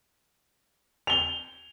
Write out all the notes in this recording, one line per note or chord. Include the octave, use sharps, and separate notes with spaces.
F7 G7